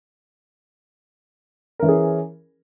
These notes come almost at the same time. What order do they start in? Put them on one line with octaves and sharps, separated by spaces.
A#4 E3 C#4 G#4